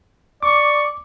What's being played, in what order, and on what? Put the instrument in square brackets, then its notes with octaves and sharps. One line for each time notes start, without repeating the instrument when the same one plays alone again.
[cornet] D5 [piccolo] C#6 [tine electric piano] D6